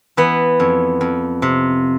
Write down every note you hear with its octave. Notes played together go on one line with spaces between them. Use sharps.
E3 B3
F2
F2
C3